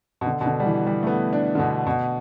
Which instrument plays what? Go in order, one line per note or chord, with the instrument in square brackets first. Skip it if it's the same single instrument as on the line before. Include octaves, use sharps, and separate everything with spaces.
[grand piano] B2
D3
B2
D3
G3
E3
G3
A3
B3
D4
D3
B2
B2